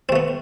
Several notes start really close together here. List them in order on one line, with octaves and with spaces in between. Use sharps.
C4 A3 B3